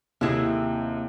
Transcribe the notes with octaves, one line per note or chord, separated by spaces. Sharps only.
D#2 C3 E4 G#4